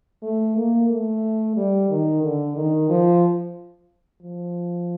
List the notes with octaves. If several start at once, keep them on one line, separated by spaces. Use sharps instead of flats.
A3
A#3
A3
G3
D#3
D3
D#3
F3
F3